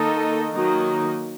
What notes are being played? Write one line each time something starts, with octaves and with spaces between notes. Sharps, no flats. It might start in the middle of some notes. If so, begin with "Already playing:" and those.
Already playing: D#3 A#3 D#4 A4 D#5
D#3 F#3 A#3 D#4